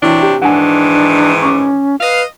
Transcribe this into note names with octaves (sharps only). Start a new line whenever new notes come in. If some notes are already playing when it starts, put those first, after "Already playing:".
C3 E3 F#3 D4 G5
G4
G#2 D#3 E3 D4 F#5 G#5
C#4 C#6 D6
B4 D#5 F5